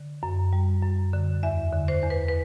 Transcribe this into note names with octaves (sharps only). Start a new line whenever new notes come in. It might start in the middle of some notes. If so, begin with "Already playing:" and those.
Already playing: D3
F#2
G3
F#2
D3
E2 E5
D3
C5
E2
B4
B4